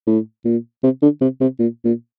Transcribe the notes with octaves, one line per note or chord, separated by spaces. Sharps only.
A2
A#2
C3
D3
C3
C3
A#2
A#2